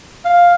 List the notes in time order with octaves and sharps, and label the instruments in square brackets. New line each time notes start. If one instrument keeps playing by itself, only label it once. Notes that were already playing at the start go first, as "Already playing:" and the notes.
[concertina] F5